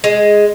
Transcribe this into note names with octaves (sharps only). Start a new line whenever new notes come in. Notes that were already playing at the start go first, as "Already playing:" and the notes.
G#3